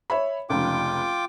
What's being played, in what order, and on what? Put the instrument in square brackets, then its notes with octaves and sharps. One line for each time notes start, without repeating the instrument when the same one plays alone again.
[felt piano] C#5 E5 B5
[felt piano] F1 C#2 [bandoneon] F4 G5 D6